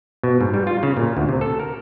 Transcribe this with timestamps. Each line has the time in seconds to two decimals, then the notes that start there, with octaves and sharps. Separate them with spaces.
0.23 B2
0.41 G#2
0.54 G3
0.67 F4
0.83 C#3
0.97 A#2
1.17 D2
1.29 C3
1.41 A4
1.60 A#4